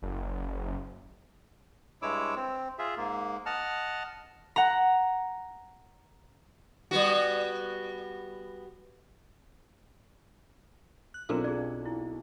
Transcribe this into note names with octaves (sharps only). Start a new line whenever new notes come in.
F#1
G2 G#3 E4 C#5 D6 E6
C4
F4 G#4 E5
G#2 A#3
D#5 F#5 A5 F6
F#5 A#5
G3 B3 F#4
F#6
B1 C4 D4 F4 A4 A#4 A#5
G#4 D5
E4